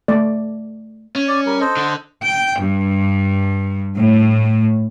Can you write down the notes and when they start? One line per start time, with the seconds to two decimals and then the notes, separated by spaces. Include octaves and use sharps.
0.08 A3 D5
1.15 C#4
1.28 D5
1.46 G3 A#4
1.61 A4 C5 D#5
1.77 D3
2.23 G5
2.60 G2
3.97 A2